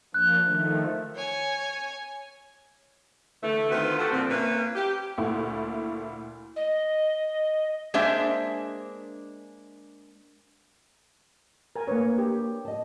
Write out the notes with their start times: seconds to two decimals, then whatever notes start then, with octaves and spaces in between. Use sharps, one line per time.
0.14 F3 A#3 D4 F#6
0.45 D#3 F3 A3
1.15 C#5 G#5
3.43 D3 E3 A3
3.69 D#3 C4 F4 F#4 B4
3.98 D4 F#4 G4 A4 F#5
4.12 A#2 D3 F3 C4
4.29 A#3 C#4 E4 B4
4.75 G4
5.18 D2 A#2 A3 E4
6.56 D#5
7.94 G#3 A#3 D4 C5 E5
11.76 A#4 G#5
11.87 A#3 D4 B4 C#5
12.18 G4
12.65 D#5 A5